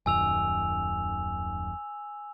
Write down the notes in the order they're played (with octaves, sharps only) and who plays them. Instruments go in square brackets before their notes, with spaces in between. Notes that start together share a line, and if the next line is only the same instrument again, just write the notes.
[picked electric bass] D#1 F#2 D#3 [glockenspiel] G#5 E6 F7